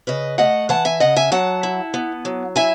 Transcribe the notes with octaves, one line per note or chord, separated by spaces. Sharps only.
C#3 B4 D#5
A3 D#5 F#5
E3 F#5 A5
E5 G#5
C#3 D#5 F#5
E5 G#5
F#3 F#5 A5
E4
B3
F#3
E4 E5 G#5